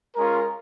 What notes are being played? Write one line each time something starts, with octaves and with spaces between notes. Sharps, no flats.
G#3 C#4 F4 A#4